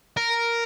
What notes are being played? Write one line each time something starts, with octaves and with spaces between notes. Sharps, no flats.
A#4